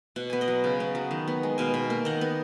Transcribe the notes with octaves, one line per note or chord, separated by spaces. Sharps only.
B2 F#5
B3 G#5
D#5 F#5
F#3
C#3
B3
F#3
D#3
B3
G#3
B2 F5 G#5
B2
A#3
D#3 D#5 F#5
B3